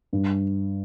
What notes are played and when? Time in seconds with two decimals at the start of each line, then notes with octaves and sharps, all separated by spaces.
0.13 G2